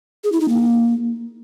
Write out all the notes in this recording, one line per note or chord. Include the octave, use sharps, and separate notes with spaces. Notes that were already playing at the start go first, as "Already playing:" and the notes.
G#4
E4
D#4
A#3